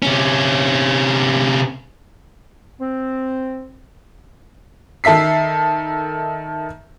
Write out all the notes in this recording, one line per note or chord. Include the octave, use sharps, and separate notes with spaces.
C3 C#4
C4
D#3 A4 E5 B6 C7